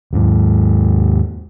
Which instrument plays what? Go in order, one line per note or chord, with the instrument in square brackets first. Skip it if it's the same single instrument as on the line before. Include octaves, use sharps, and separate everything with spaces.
[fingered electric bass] D#2 G#2